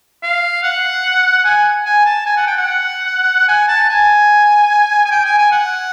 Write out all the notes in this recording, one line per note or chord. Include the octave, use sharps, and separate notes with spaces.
F5
F#5
G#5
G#5
A5
G#5
F#5
G5
F#5
G#5
A5
G#5
G#5
G5
G#5
G#5
F#5